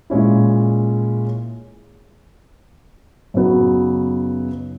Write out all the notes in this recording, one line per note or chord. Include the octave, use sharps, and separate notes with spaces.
A#2 G#3 C#4 E4
F#2 C#3 F#3 B3 D#4